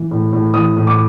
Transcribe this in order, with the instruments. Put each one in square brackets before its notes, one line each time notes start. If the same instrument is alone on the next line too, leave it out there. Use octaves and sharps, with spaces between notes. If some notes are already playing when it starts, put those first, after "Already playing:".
Already playing: [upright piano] E3
A2
A2
E3 D#6
A2
D6